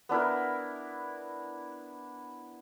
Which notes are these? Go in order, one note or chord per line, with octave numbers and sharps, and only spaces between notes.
B3 D4 E4 A#4